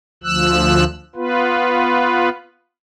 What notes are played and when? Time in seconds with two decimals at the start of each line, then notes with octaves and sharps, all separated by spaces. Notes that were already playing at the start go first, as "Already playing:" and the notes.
0.24 D2 F3 E6 F#6
1.16 B3 F4 B4